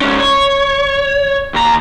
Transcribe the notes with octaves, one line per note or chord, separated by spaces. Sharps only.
G#2 C#4
C#5
D#2 A#5